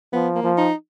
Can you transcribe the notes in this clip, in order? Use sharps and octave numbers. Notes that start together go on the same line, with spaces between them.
F3 B3
A#3
F3
D#4